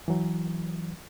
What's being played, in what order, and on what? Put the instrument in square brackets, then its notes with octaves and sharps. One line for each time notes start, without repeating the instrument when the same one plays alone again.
[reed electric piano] E3 F#3